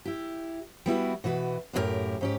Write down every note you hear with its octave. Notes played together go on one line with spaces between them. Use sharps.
E4 G4
G3 B3 E4 F#4
B2 E3 F#4 B4
F#2 A2 D#4 F4 G4 A#4
G#2 C#4 G4